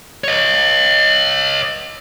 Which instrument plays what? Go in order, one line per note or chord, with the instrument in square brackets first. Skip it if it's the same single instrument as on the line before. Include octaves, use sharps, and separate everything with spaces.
[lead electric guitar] C#5 D#5